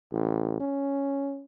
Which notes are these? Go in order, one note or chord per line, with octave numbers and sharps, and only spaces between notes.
A1
C#4